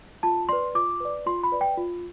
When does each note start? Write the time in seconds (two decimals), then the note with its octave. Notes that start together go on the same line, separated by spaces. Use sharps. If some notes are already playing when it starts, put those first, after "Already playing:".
0.23 F4 A5
0.49 B4 D5 C6
0.75 F4 D6
1.00 B4 D5
1.26 F4 C6
1.43 B5
1.52 B4 D5
1.61 G5
1.77 F4